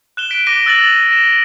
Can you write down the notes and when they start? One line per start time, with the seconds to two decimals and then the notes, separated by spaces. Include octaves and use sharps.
0.17 F#6 E7 G7
0.31 B6 D7
0.46 D6 F#6 A#6 B6 D#7 G7
0.66 E6 F#6 A6 A#6 F#7
1.11 A#6 E7 G7